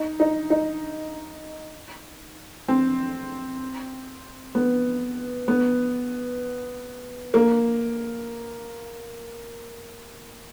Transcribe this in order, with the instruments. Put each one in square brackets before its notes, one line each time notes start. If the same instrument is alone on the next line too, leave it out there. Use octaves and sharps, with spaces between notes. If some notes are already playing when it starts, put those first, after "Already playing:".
Already playing: [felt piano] D#4
D#4
D#4
C4
B3
B3
A#3